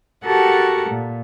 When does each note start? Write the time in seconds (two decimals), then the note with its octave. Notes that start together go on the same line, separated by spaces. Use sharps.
0.24 F#4 G4 A4 A#4 F#5 A5
0.89 A#2